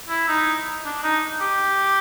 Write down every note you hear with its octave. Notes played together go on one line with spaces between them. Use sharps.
E4
D#4
D4
D#4
G4